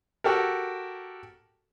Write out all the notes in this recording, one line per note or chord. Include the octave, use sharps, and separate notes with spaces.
F#4 G4 A4 A#4